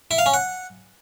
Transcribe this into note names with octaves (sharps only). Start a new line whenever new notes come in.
E4
F5
C#4
F#5